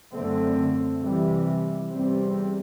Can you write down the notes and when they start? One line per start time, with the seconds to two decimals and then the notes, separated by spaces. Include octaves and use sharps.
0.12 F#2 D3 A3 C4
1.01 C3 E3 G3
1.92 E2 C3 G3 C4